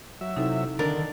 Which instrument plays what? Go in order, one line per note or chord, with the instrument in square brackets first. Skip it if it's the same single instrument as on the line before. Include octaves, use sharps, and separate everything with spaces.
[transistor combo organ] F#3 E5
[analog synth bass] C3 [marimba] D#4 E4 A4
[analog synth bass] D3 [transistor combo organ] D#3 [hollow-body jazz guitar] D4 A#4